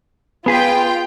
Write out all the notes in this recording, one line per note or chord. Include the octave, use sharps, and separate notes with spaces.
B3 F4 G#4 B4 G5